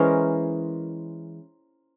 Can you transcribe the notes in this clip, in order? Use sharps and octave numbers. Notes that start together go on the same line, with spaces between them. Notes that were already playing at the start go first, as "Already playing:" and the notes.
Already playing: E3 G#3 C#4 A#4 C5